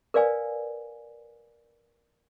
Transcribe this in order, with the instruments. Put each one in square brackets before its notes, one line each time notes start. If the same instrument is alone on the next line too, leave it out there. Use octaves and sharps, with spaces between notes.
[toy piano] A#4 B4 D5 F5 G#5